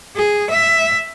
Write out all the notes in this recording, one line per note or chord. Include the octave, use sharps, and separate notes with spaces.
G#4
E5